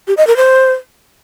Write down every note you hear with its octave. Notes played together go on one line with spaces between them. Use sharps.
G4
D#5
A#4
C5